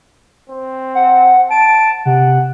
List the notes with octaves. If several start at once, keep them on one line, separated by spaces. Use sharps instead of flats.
C4
F#5
A5 D7
C3 F#5